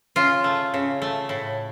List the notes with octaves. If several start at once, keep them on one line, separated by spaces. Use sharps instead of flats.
C#3 F4
A3
C#3
A3
A2